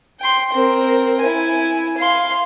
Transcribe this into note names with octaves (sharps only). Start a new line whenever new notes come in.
G5 C6
C4 A#4
E4 G#5
F5 C6